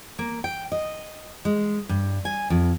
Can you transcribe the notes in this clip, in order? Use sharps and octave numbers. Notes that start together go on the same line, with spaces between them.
A#3
G5
D#5
G#3
G2
G#5
F2